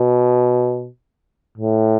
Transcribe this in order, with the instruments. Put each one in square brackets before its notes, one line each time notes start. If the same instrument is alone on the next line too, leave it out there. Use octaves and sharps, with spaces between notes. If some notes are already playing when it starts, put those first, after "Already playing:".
Already playing: [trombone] B2
A2